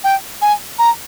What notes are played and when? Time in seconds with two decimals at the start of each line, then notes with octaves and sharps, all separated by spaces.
0.04 G5
0.42 G#5
0.79 A#5